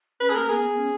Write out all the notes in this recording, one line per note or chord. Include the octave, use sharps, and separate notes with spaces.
C#4 B4
G#4
A#3 A#4
B3 G#4
C#4